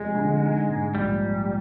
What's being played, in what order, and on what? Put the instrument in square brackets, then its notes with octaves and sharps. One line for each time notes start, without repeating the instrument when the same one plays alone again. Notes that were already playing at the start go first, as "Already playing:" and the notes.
Already playing: [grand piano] F1 G#4 [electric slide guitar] G#3
[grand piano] D3
D#4
G#2
[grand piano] A#1 [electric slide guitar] G3
[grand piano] A#1